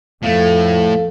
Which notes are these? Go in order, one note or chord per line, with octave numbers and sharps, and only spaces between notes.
F2 A2 A3 A4 F5